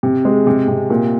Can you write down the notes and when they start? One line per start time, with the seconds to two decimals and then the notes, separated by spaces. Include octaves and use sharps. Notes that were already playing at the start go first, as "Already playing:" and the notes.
0.03 C3
0.25 G#3
0.47 C3
0.68 C3
0.90 A#2